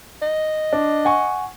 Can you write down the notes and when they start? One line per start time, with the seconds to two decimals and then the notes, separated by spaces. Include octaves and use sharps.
0.22 D#5
0.73 D4
1.05 F#5 G#5 C#6